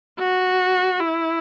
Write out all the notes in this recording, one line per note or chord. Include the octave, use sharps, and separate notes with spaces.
F#4
E4